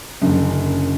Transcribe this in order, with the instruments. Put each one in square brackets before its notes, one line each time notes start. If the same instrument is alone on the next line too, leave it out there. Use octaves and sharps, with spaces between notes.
[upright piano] F#1 F#2 D3